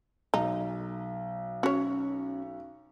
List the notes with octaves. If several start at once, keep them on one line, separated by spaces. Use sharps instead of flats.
B1 D#4
C#4 F#4 C#5